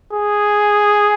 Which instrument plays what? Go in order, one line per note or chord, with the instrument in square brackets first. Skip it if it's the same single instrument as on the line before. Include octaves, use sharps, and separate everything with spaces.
[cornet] G#4